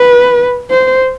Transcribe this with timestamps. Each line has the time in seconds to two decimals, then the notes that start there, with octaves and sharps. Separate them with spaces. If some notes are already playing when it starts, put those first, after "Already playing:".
Already playing: B4
0.71 C5